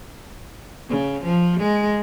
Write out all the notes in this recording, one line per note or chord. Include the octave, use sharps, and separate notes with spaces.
C#3
F3
G#3